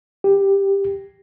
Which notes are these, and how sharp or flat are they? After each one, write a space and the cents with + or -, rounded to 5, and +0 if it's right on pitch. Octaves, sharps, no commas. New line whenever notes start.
G4 +10